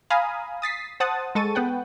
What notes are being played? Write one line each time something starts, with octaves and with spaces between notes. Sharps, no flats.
F5 G#5 A#5 B5 D#6
D#6 A6 B6 C7
C5 F#5 A5 D#6 A6
G#3 A4 C#6 A6 D#7
B3 B4 F#5 G5